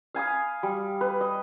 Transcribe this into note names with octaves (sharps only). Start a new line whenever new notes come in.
F5 G#5 B5 D#6
G3
B4
D#5